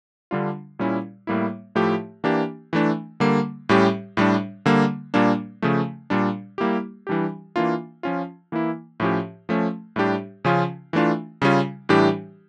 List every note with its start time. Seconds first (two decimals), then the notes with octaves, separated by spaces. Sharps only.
0.31 D3 G3 D4 F4
0.79 A#2 G3 C#4 E4
1.27 A2 G3 A#3 E4
1.75 A2 F3 A3 E4 G4
2.24 E3 A#3 D4 G4
2.73 E3 A3 D4
3.20 D3 G3 A#3
3.69 A2 G3 C#4 G4
4.17 A2 G3 D4
4.66 D3 G3 A#3
5.14 A#2 G3 A#3 D4
5.62 C#3 F3 A3
6.10 A#2 G3 D4
6.58 G3 A#3 E4 G4
7.07 E3 G3 D4 G4
7.56 E3 A#3 D4 F4
8.03 F3 C#4 F4
8.52 E3 A#3 E4
9.00 A2 F3 C#4 G4
9.49 F3 A3 C#4
9.96 A2 G3 D4 G4
10.45 C#3 F3 C#4 F4
10.93 E3 A3 D4 F4
11.42 C#3 G3 C#4 F4
11.89 A2 E3 G3 D4 G4